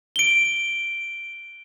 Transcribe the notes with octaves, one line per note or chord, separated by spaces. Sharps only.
D7 G7